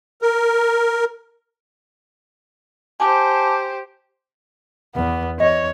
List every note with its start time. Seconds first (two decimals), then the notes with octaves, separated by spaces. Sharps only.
0.22 A#4
3.00 G4 C5 G#5 A5 D6
4.95 E2 B3
5.40 E2 C#5 D#5